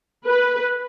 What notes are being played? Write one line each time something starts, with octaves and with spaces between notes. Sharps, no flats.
B4